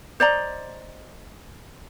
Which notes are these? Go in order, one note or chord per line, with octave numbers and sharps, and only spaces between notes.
C5 D5 D#5 A#5